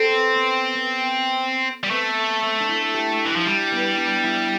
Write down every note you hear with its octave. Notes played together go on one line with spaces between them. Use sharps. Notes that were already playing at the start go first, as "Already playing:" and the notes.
Already playing: C4 A4
B3
B3
B3
G3 B3
A3 C4
C4
D4
E4
G4
E3
F3 E4
G3 D4
B3
D4
E4